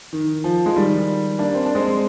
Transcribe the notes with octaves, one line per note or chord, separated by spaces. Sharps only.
D#3
F3
G#3
D#3 G3
A#3 D4
C4
D4
G#3 C4